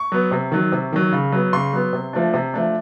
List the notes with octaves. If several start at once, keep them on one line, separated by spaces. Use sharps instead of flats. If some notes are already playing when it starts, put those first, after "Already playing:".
Already playing: C#6
F#3 B3
C3
D#3 F#3
C3
D#3 F#3
C#3
F#3 B3
C#3 C6
F#3 B3
C3
F3 A3 D4
C3
F3 A3 D4